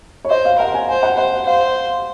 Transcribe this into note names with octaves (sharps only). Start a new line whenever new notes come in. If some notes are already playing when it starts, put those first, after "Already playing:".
C#5
C5 D#5
F5
A#4 F#5
G#5
C5 G#5
F#5
C5 F#5
C5 F5